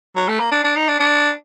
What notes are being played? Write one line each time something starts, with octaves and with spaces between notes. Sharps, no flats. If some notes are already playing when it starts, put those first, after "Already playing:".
F#3
A3
A#3
D4
D4
D#4
D4
D4